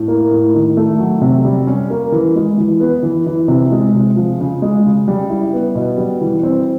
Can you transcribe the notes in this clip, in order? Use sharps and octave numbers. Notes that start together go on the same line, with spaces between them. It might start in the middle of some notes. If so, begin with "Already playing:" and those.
Already playing: A2
A#3
A2
D#3
A3
F#3
C3
G3
C#4
A#3
E3
G#3
E3
B3
E3
E3
C3
G#3
C3
F3
C#3
G#3
C#3
G3
E4
B3
B2
G3
E3
C4